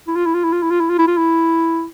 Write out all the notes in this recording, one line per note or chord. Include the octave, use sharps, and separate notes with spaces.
E4
F4
E4
F4
E4
F4
E4
F4
E4
F4
E4
F4
E4